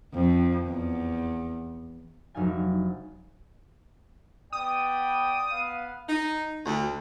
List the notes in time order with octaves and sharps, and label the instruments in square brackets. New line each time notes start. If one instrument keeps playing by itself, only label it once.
[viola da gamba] F2
E2
[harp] F1 F#3 D4 D#4 F5 G#5
[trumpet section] B3 D5 G5 [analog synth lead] D#6
[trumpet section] B3 B4 F5
[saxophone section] D#4
D2